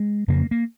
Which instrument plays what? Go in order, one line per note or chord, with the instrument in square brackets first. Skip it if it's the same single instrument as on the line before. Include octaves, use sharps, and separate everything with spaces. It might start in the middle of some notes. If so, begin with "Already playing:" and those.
Already playing: [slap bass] G#3
F2 C#3 A#3
A#3